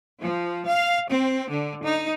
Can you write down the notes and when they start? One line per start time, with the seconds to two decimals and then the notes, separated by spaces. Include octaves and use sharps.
0.21 F3
0.67 F5
1.09 C4
1.51 D3
1.84 D#4